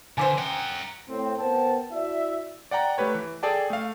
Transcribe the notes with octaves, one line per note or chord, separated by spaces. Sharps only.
D3 A#3 B4 C5 G#5 D6
A#4 F#5 G5
A2 C4
B3 A#4 C5 G5 A5
E4 F#4 D5 E5
D5 F#5 G5 A#5
A3 G4 B4 C#5
E3
G#4 A4 D5 G5 A5
A3 F5